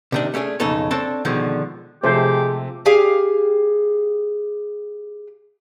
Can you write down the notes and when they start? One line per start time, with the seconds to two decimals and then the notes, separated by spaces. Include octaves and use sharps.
0.12 C3 D#3 D4
0.34 A3 C#4 D4 G#4
0.60 B1 F2 C#3 D#4 A4 C#5
0.91 C4 D4 A4 C#5 A5
1.25 B2 D3 D#3 F3 G#3
2.04 C3 F3 G#3 A3 G4 C5
2.86 G4 G#4 F5